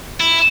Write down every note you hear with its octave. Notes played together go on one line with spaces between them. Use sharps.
E4